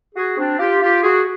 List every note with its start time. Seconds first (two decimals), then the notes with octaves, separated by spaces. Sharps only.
0.15 F#4 G#4
0.37 C4 D4
0.59 F4 G4
0.81 F4 G4
1.03 F#4 G#4